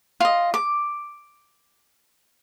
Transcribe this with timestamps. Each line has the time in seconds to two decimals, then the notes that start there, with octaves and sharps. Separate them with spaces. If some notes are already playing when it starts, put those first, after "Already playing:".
0.20 F4 D#5
0.54 D6